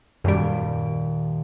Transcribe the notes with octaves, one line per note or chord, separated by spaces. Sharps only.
D#1 F#2 G3 D7